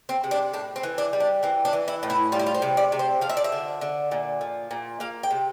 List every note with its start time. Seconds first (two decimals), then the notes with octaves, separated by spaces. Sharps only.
0.09 C4
0.24 C3
0.31 D4
0.53 A2 D4
0.76 C4
0.83 E3
0.98 D4
1.13 G3
1.20 D4
1.43 E3 C4
1.65 D4
1.73 E3
1.88 E4
2.03 A2
2.10 E4
2.32 G3 F4
2.39 E4
2.47 F4
2.55 C5
2.62 C3
2.77 D5
2.92 C3
2.99 C5
3.21 F3 F5
3.30 E5
3.37 D5
3.44 E5
3.52 D3
3.81 D3
4.11 A#2
4.41 F3
4.71 A#2
5.00 A#3 F5
5.23 G5
5.31 C3